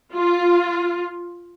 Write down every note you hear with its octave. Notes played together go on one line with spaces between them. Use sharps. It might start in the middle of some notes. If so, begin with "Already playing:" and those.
F4